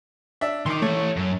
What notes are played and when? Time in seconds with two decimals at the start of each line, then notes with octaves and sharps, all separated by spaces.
0.41 D4 E5
0.66 D#3 C6 D6
0.82 E3 A3 C#5
1.17 F#2